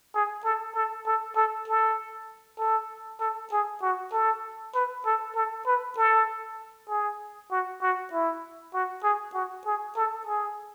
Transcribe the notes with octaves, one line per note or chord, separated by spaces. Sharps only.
G#4
A4
A4
A4
A4
A4
A4
A4
G#4
F#4
A4
B4
A4
A4
B4
A4
G#4
F#4
F#4
E4
F#4
G#4
F#4
G#4
A4
G#4